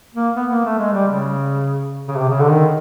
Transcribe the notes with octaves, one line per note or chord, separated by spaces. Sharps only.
A#3
B3
A#3
A3
G#3
G3
C#3
C#3
C3
C#3
D3
D#3